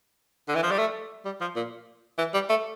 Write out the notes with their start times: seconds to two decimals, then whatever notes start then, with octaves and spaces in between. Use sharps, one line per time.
0.48 D3
0.55 E3
0.63 F3
0.71 G3
0.79 A3
1.25 G3
1.41 F3
1.56 A#2
2.18 E3
2.34 G3
2.50 A3